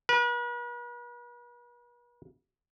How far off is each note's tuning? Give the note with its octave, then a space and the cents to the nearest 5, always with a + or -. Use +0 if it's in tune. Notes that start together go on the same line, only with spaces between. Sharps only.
B4 -40